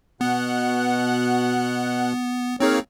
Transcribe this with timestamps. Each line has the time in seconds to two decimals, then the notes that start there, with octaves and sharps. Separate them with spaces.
0.21 B2 B3 F#5 F#6
2.60 A#3 C4 D#4 G#4 C#5 F6